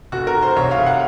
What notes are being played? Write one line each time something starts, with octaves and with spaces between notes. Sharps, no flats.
F1 F#4
A#4
F1
C5
C2 C#5
F5
C2
F#5